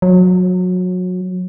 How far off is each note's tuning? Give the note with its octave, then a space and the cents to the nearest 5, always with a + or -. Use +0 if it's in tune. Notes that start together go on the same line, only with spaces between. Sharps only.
F#3 -25